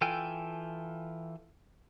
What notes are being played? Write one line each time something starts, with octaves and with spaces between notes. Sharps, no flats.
E3 F4 A4 G5 G#5